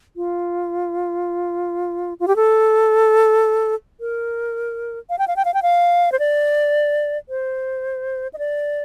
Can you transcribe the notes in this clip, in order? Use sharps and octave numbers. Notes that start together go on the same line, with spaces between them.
F4
F4
G4
A4
A#4
F5
G5
F5
G5
F5
G5
F5
C5
D5
C5
D#5
D5